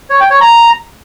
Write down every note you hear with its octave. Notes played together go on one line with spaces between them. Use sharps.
C#5
G5
C#5
A#5